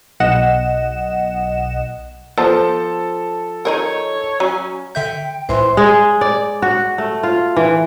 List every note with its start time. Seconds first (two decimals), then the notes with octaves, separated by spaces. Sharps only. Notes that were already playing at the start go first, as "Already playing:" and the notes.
0.20 B1 D#5 F#5 E7
2.38 F3 B3 A4 C5 A5
3.65 D#3 D#4 A#4 C#5
4.40 F#3 C#4
4.95 D3 E5 G5 G6
5.49 C#2 A2 E3 C5 C6
5.77 G#3
6.21 D5
6.62 F#4
6.98 A3
7.23 F4
7.57 E3